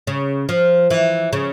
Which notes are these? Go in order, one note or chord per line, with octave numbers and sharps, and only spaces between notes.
C#3
F3
E3
C#3